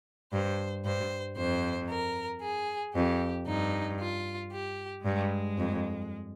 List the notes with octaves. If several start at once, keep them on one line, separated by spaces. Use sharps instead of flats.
G2 C5
G2 C5
F2 C5
A#4
G#4
F2 G4
G2 D#4
F4
G4
G2 G#3
F2